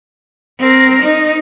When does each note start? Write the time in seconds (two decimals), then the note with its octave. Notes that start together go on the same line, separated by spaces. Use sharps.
0.60 C4 A#4
1.03 D#4